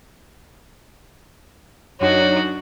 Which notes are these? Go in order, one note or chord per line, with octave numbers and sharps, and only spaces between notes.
F#2 D4 D#4 F#4 C#5